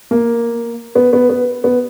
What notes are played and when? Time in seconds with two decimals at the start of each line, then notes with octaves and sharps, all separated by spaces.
0.11 A#3
0.95 B3
1.13 B3
1.29 B3
1.64 B3